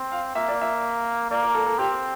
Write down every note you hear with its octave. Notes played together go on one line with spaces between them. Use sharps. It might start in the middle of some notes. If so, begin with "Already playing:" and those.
Already playing: C4
F5
A#3 E5
D5
E5
A#3 D5
A#4
A4
A4
C4 G4